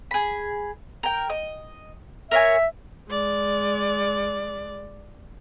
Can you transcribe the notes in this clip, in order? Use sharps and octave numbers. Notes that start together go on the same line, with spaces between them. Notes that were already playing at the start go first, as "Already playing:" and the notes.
G#4 B5
A#4 G5
D#5
A#4 C#5 E5 G#5
G#3 D5